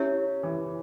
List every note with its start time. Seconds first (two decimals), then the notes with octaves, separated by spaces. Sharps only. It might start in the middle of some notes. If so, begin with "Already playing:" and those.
Already playing: C#4 E4 G4 A#4 C#5 E5
0.43 E3